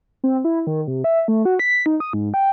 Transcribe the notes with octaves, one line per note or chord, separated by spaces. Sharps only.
C4
E4
D#3
C3
E5
A3
F#4
B6
D#4
D#6
G#2
G5